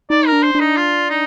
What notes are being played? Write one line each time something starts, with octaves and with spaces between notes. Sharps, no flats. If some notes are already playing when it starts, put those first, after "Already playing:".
D#4 D5
A#4
D4
C5
D4 D#4
F4
D#4